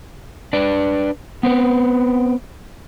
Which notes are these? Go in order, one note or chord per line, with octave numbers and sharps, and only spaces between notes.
D4 B4 D5
B3 C4 B4